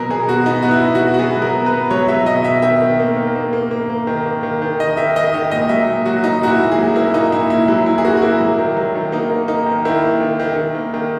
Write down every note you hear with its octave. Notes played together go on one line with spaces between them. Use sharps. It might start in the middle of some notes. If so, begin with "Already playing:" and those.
Already playing: B2 F#3 A#4
B2 G#4
B2 F#4
B3 D#4
B3 F#4
E4
B2
F#4
B2
F#4
B3 G#4
F#3
A#4
B2
B4
B3
F#3 C#5
F#3 E5
B2 D#5
B2 E5
D#3 E5
D#3
A#3
D#3
A#3
A#3
A#3
A#3
D#3
A#3
D#3
D#3
D#3 D#5
D#3 E5
D#3 D#5
D#3 D#5
A#2 D#5
F#3 E5
A#2
F#3 F#4
A#2 D#4
A#2 F#4
E4
A#2
G#4
F#3
A#3 E4
A#2 D#4
A#2 E4
A#2 E4
F#3 E4
A#2 E4
G#4
A#3 F#4
F#4
A#3 E4
F#3
D#3
F#3
D#3
A#3 D#4
A#3
A#3 D#4
D#3
D#3 E4
A#3
D#3
D#3
D#3
A#3
D#3